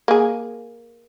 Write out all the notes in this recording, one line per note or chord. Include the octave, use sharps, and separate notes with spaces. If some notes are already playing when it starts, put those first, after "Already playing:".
A#3 G#4